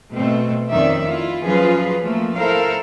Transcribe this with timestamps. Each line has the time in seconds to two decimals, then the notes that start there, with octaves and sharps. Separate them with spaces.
0.14 B2 A3 C4
0.71 F2 D#3 C4 C#4 D5 E5
1.06 E4 F4
1.43 F3 F#3 C#4 F4 G#4 B4
2.03 F3 A3 A#3
2.38 E4 A4 A#4 C5 F5